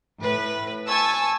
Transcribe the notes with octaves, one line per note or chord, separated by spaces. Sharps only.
A2 B4
G#5 A5 C#6 E6